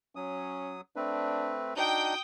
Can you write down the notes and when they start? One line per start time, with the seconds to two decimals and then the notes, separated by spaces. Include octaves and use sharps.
0.16 F#3 C#4 D#6
0.96 A3 C4 D4 B4
1.77 D4 D#4 F#4 G5 D#6 G6